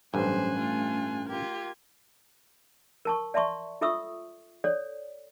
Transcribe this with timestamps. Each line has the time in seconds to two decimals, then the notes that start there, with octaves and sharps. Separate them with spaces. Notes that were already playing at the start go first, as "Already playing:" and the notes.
0.14 A1 G2 F#3 C#4 C5 G#5 F#6
0.59 A3 F4
1.29 F4 G4 A#4 G#6
3.05 A#4 A5 C#6
3.34 D5 E5 A5 C6 C#6
3.81 F4 A4 E5 C#6 D#6 E6
4.64 A4 C#5 D5